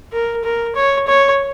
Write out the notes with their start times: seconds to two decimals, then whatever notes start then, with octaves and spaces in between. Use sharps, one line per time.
0.12 A#4
0.44 A#4
0.76 C#5
1.08 C#5